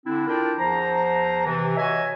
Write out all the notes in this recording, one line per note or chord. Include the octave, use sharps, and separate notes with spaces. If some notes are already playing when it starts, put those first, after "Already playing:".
D3 C4 D4 E4
D4 E4 F4 A#4 G5
E2 F3 C5 A#5
C3 E3
F#4 C#5 D#5 E5 G#5